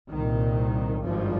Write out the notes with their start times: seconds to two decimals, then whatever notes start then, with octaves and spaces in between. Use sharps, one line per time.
0.11 C2 A#2 D#3
1.03 G#1 G2 F3